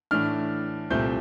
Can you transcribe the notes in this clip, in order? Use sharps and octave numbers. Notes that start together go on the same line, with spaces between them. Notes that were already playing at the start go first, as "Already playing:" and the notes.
A2 E3 A3 D4 F6
C2 A#2 A3 C4 G6